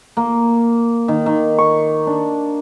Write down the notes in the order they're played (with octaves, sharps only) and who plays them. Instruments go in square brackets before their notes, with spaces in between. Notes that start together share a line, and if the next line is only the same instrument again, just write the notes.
[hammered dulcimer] A#3
D#3
D#3
C#6
D4